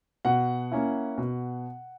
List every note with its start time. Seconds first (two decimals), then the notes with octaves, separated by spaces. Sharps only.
0.25 B2 F#5
0.71 A#3 C#4 E4
1.18 B2